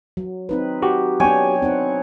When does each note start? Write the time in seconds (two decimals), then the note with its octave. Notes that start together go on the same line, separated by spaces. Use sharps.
0.17 F#3
0.49 C4 D#4 B4
0.82 F#4 G4
1.20 F#3 B3 D4 C#5 G5 G#5
1.62 C4 D#4 F#5